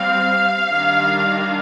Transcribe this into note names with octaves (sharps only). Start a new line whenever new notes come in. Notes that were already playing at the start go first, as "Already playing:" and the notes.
Already playing: G3 C4 F5
D#3 G3 D4